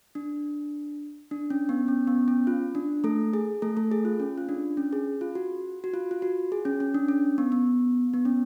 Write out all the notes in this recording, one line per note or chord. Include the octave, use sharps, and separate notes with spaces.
D4
D4
C#4
B3
C#4
B3
C#4
F4
D4
A3 A4
G#4
A3 A4
A3 A4
G#4
F4
C#4
F4
D4
C#4
G#4
F4
F#4
F#4
F4
F4
F#4
G#4
C#4
C#4
D4
C#4
B3
B3
B3
C#4